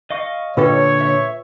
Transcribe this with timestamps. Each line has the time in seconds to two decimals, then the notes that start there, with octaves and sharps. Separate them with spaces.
0.10 D#5 F5 C#6
0.57 A#2 D3 F4 A4 B4 C#5 G5
1.01 E5